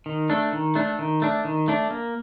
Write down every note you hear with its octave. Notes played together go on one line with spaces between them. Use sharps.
D#3
A3 D4
D#3
A3 D4
D#3
A3 D4
D#3
A3 D4
A#3